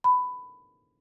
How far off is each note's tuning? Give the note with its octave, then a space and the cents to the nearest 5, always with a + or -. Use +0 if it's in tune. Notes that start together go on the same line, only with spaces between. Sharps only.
B5 +15